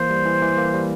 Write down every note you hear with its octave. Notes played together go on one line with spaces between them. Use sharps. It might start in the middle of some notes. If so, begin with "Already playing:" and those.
Already playing: E3 A#3 C5
G3
E3
E3
A#3
G3